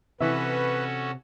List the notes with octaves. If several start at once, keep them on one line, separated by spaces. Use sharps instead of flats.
C3 E3 C#4 F#4 A4 B4 E5